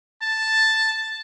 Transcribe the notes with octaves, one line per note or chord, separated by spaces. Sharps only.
A5